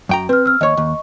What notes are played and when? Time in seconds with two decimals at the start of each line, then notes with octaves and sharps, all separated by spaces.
0.09 F#2 G5 A#5
0.29 C4 B4 F6
0.46 E6 F6
0.61 D#2 C#5 D#5 C#6
0.77 D#2